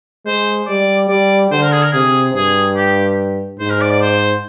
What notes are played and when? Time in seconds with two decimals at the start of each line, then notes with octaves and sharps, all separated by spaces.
0.26 G#3 C5
0.68 G3 D5
1.09 G3 D5
1.51 D3 C5
1.62 A#4
1.73 G#4
1.83 A#4
1.92 C3 G#4
2.34 G2 G#4
2.76 G4
3.59 G#2 C5
3.70 A#4
3.81 D5
3.91 D5
4.02 C5